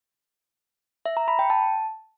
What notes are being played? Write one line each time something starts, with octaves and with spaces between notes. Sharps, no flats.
E5
A#5
B5
G5
A5